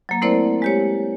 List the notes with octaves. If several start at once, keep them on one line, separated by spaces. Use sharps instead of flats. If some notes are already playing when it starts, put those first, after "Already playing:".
F#3 A#3
A3 C4 E4 A#4 C5 D5
G#3 G4 C#5